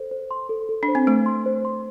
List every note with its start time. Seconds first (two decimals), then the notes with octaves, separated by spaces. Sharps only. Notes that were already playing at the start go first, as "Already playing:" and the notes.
Already playing: A4 C5
0.11 C5
0.31 C6
0.49 A4
0.69 A4
0.83 D4
0.88 C5
0.95 C4
1.07 A3 C5
1.26 C6
1.46 C5
1.65 C6